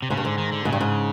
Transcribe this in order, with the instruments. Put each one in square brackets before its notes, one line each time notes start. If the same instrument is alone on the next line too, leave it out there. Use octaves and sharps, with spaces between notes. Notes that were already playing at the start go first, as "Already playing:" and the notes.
[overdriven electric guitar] C3
[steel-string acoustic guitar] G#2 [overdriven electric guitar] C#3
[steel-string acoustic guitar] G2
[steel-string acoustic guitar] G#2 [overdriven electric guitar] D3
[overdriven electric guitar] D#3
D3
[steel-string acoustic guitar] G#2 [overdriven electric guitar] C#3
[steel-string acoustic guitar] G2
G#2